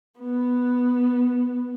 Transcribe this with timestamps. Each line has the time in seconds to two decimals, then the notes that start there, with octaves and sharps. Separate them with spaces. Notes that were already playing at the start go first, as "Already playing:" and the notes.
0.20 B3